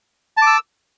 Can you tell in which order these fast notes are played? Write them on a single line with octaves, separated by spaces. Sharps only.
A5 D6 E6